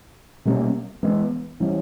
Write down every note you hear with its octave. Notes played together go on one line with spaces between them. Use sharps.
B2 G3 A#3 C#4
E3 G#3 B3
E3 G3 C#4